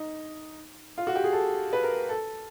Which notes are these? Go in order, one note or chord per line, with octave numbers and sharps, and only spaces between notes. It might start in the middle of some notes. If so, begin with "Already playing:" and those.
Already playing: D#4
F4
F#4
G4
G#4
A4
B4
A#4
A4